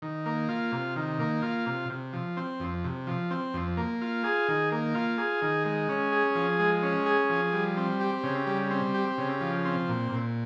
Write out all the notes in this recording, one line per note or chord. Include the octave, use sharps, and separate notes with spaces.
D#3
A#3
F4
C3
D#3
A#3
F4
C3
C3
F3
C4
F2
C3
F3
C4
F2
A#3
F4
G#4
D#3
A#3
F4
G#4
D#3
G#3
C#4
G#4
F3
G#3
C#4
G#4
F3
G3
C4
G4
C#3
G3
C4
G4
C#3
F3
C4
A#2
A#2